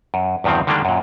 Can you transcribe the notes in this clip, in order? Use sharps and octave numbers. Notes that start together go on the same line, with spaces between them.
F#2
E2 G2 D#3 F3 C4
D3 D#3 G3 G#3 A#3 D4
F#2 A#2